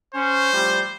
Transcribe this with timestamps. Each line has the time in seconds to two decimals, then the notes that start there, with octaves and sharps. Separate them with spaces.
0.14 C#4 C5
0.52 A2 F3 G3